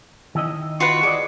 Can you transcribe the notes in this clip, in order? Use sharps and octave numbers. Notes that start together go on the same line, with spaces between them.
D#3 E4 D#5
F4 F#4 B4 C#6
G#4 D5 D#5 D6